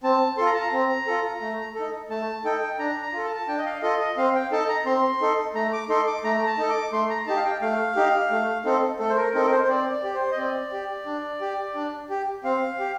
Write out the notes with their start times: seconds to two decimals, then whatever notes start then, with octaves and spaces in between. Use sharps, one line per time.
0.04 C4 A5
0.38 F4 A4 C6
0.46 A#5
0.54 A5
0.61 A#5
0.73 C4
1.07 F4 A4
1.41 A3
1.75 D#4 A4
2.10 A3 A5
2.45 D#4 A4 G5
2.79 D4 A#5
3.02 A#5
3.13 F4 A4
3.25 A5
3.36 A5
3.48 D4 G5
3.58 D#5
3.66 F5
3.82 F4 A4 D#5
3.99 D#5
4.17 C4 F5
4.35 G5
4.51 D#4 A4 A5
4.68 A#5
4.85 C4 C6
5.21 D#4 A4
5.55 A3 A#5
5.73 D6
5.89 D#4 A4 C6
6.07 D6
6.24 A3 A#5
6.37 A#5
6.47 A5
6.58 D#4 A4
6.70 D6
6.92 A3 C6
7.10 A#5
7.27 D#4 G4 A5
7.36 F5
7.45 G5
7.61 A3 F5
7.96 D#4 G4
8.31 A3
8.65 C4 D#4 A4
8.99 A3 A4
9.09 C5
9.17 A#4
9.34 C4 D#4 A4 A#4
9.45 A#4
9.51 C5
9.64 C5
9.68 C4 D5
9.91 D5
10.04 G4
10.14 C5
10.32 D#5
10.37 C4 D5
10.72 G4
11.06 D4
11.41 G4
11.75 D4
12.10 G4
12.44 C4 F5
12.79 G4